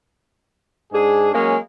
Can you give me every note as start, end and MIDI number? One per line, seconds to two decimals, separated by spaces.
0.92 1.31 44
0.92 1.31 62
0.92 1.31 68
1.33 1.55 54
1.33 1.55 56
1.33 1.55 58
1.33 1.55 61